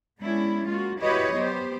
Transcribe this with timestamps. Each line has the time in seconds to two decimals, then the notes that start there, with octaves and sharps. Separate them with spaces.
0.21 G#3 B3 C#4 D4 E4
0.66 G#3 A#3 F4 F#4
1.01 E4 F#4 G4 B4 C#5 D#5
1.35 F#3 B3 G4 C5